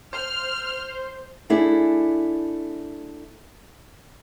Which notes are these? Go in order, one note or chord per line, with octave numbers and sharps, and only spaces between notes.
C5 F6
A3 D4 E4 G#4